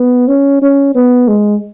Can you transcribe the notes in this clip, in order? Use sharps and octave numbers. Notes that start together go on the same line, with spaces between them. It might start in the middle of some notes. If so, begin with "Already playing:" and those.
Already playing: B3
C#4
C#4
B3
G#3